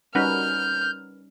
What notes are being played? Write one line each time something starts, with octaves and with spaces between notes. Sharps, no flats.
G3 C#4 D#4 F#4 A#4 B4 F6 G6